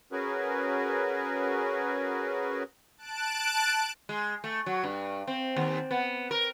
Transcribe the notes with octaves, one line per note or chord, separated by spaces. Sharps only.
C#4 F#4 G#4 A#4 B4
A5 F#6 D7
G#3
A3
F#3
G2
C4
D#2
B3
A#4